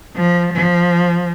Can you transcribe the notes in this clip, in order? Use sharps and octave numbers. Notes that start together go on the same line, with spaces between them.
F3
F3